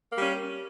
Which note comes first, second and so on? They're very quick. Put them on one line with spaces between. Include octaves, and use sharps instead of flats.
A#3 G3 C#4